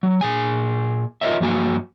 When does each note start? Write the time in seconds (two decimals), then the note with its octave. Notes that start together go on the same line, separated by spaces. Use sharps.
0.03 F#3
0.21 A#2 G#4 G#5
1.21 F4 A#4 C5 C#5 D#5 E5
1.40 G2 F3 F#3 A#3 F#4 G#5